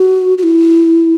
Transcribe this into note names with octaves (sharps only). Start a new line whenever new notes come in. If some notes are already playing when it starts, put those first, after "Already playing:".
Already playing: F#4
F#4
E4